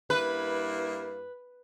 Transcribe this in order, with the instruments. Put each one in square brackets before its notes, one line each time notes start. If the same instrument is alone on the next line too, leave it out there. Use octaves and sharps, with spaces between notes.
[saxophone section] G2 A#3 E4 [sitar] B4